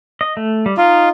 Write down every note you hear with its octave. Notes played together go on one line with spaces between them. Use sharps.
D#5
A3
G3
D#4 F4